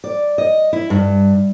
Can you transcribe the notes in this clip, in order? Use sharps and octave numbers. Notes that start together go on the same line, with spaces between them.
D5
D#5
E4
G2